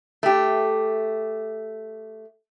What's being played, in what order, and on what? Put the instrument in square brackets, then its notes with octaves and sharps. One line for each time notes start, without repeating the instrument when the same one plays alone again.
[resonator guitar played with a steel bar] A3 G4